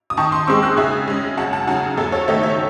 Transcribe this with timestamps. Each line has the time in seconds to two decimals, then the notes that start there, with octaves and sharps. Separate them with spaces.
0.10 D#6
0.17 D#3 A5 C#6
0.32 C6 D#6
0.47 G#3 C4 C#6 E6
0.63 D#6 F#6
0.77 C#3 E5 G#5
1.08 G#3 C#4
1.37 F#2 F#5 A5
1.53 F#5 A5
1.67 C#3 F#3 F#5 A5
1.98 E2 A4
2.12 A4 C#5
2.28 D#3 A3 D#4 C#5 E5
2.43 C#5 E5